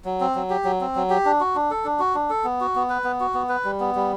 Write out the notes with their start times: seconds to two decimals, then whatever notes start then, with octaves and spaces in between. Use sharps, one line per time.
0.05 F#3
0.20 C4
0.35 F#3
0.50 G4
0.65 F#3
0.81 C4
0.96 F#3
1.10 G4
1.25 D4
1.40 F#4
1.55 D4
1.71 A4
1.84 D4
1.99 F#4
2.15 D4
2.30 A4
2.44 B3
2.60 F#4
2.75 B3
2.89 B4
3.04 B3
3.20 F#4
3.34 B3
3.49 B4
3.64 G3
3.80 B3
3.95 G3